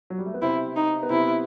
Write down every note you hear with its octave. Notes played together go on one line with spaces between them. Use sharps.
F#3
G3
A3
B3
C3 C4 E4
D#4
B3
C3 C4 E4